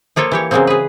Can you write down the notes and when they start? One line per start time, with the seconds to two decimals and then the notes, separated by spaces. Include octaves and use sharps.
0.16 F3 A#3 F4 A4 C#5
0.32 E3 G4 C#5
0.51 C#3 E3 F#3 G#3 A#3 C4
0.67 G#4 B4